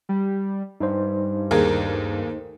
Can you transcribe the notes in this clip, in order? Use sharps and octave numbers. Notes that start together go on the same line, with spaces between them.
G3
G2 D#4 C5
D#2 A3 A#3 G4 G#4 A#4